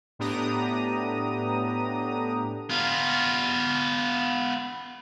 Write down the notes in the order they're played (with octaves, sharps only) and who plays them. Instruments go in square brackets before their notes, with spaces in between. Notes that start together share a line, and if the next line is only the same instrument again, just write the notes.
[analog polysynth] A2 B3 D4 G4 A#5 D#6
[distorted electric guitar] B3 F4